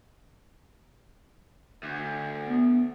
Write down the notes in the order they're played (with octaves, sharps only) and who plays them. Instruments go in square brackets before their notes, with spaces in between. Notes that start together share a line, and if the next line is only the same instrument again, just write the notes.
[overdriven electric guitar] D2
[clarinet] B3